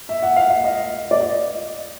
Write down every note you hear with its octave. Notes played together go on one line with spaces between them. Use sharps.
E5
F#5
F5
F5
D#5
D5
D#5